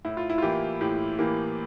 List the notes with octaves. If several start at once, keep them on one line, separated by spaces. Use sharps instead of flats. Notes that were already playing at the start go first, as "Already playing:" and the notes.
A2 E4
F4
E4
F4
E3 A#3 G4
A2 G4
E3 A#3 G4